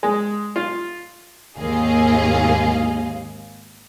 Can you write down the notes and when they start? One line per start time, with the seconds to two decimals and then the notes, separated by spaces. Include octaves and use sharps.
0.03 G#3
0.56 F4
1.58 G#1 D#2 G#4 D#5 F5